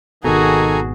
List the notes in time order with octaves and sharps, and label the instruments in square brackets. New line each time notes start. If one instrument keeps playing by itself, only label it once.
[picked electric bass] G#1 B2 [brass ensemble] D#3 [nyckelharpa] F#4 G#4 [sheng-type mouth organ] A4 G#5 A#5